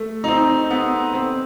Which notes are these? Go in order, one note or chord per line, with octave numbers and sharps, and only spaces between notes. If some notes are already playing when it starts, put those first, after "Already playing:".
Already playing: A3
D#4
C4
B3
C4